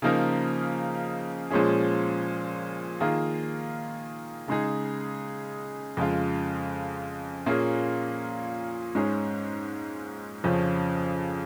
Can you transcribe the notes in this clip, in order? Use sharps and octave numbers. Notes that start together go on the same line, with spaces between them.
C#3 F3 A#3 D#4 A#4
A#2 F3 G#3 C#4 G#4
D#3 A#3 F4 G#4
C#3 G#3 D#4 G#4
F2 C#3 G#3 F4
A#2 A#3 C#4 F4 G#4
G#2 G#3 C#4 G#4
F2 C#3 F3 C#4